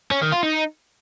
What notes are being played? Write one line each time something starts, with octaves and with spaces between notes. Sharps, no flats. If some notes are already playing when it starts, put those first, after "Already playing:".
C#4
D#3
F4
D#4